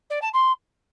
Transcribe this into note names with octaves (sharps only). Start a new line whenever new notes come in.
D5
A5
C6